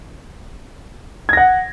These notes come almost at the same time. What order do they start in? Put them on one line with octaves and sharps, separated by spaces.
G#6 A#6 F#5